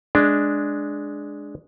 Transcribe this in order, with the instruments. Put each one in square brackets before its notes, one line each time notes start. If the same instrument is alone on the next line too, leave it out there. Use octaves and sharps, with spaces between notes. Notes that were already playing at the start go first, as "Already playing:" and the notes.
[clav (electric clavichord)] G#3 D4